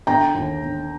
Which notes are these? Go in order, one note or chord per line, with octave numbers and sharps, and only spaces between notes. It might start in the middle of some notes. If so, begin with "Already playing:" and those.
D3 G5 A#5
D#2
D3